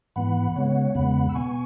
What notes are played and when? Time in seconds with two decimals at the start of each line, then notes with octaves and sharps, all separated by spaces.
0.16 G#2 E3 B3 F#5 B5
0.55 C#3 G#3 B3 C#5 F#5
0.95 E2 C#3 G#3 B3 F#5 B5
1.29 E6
1.35 B2 B3 G#5 C#6